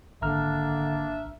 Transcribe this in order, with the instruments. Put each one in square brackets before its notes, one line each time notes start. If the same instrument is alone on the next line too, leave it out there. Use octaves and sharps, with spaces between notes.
[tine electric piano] G#1 A#5 F6 [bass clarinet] D3 [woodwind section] A#3 D4 [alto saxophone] E5